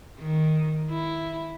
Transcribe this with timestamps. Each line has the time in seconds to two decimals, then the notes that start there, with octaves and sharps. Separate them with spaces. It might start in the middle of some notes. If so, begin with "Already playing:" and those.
0.19 D#3
0.91 E4